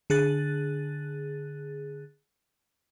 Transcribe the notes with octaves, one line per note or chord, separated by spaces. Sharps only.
D3 G#4 F#6 A6